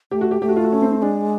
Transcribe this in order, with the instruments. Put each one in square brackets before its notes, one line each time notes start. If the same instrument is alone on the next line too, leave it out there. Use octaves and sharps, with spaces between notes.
[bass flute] A3 [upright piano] G4
[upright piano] F#4
G4
[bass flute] A3 [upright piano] G4
[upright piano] F#4
F4
F#4
C#4
C4
C4
[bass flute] G#3 [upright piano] D4